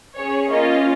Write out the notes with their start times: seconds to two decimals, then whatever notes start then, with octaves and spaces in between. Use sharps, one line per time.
0.16 C#4 G#4 C#5
0.49 A#3 C#4 F4 D#5